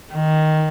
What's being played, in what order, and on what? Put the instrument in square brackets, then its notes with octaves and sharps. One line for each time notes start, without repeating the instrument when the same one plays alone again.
[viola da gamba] D#3